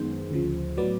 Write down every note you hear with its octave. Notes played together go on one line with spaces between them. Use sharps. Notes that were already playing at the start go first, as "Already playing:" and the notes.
Already playing: F#2 D#3 G#3 B3 C5
D2 C#3 F3
A2 F#3 B3 D5